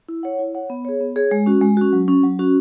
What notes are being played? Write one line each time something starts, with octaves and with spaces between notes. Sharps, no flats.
E4
C#5 F#5
E4
C#5 F#5
B3
G#4 C#5
B3
G#4 C#5
G#3
C#4 F#4
G#3
C#4 F#4
F#3
C#4 F#4
F#3
C#4 F#4